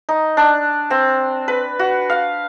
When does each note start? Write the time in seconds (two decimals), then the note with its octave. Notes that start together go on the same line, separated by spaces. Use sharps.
0.09 D#4
0.37 D4
0.90 C4
1.48 B4
1.79 F#4
2.10 F5